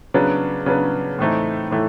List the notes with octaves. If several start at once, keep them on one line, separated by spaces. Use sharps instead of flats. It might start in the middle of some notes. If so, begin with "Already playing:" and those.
C#3 F#3 B3 D4
C#3 F#3 B3 D4
A2 E3 A3 C4 D#4
A2 E3 A3